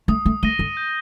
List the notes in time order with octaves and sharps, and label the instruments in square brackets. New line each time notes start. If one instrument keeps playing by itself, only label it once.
[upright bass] A3 [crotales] D#6
[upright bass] A3
[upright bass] A3 [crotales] A#6 D#7 G7
[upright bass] D3
[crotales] G6